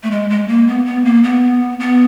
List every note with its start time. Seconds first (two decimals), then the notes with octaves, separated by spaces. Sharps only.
0.03 A3
0.11 G#3
0.30 G#3
0.48 A#3
0.67 B3
0.86 B3
1.05 A#3
1.23 B3
1.80 B3